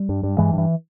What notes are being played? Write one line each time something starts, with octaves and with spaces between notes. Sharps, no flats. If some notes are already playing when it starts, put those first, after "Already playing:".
Already playing: G3
G2
G2
G2 E3 G#3
G2
E3